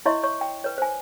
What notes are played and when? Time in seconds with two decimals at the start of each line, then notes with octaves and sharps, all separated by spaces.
0.05 E4 C#5 D#5 E5 C6 C#6
0.23 C#5 C#6
0.41 G5
0.64 B4 C#5
0.78 C5 G#5